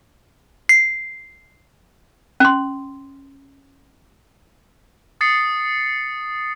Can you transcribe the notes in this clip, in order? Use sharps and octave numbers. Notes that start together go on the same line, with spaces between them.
C7
C#4 C6
D#6 A6 C7 C#7